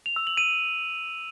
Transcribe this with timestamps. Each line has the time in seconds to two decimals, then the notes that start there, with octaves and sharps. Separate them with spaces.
0.06 F7
0.16 E6
0.27 F#7
0.37 D#7